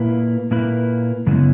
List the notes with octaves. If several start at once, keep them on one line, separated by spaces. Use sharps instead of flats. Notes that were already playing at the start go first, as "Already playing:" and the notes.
Already playing: A#2 A#3 E4 B4
A#2 A#3 E4 B4
F#2 C#3 G#3 B3 E4